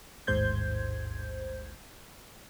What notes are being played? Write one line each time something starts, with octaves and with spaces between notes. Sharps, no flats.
A1 D#2 G#2 C5 G6 G#6